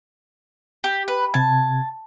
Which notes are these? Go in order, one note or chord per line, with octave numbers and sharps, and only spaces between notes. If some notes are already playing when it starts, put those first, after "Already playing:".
G4
B4
C3 A5 G#6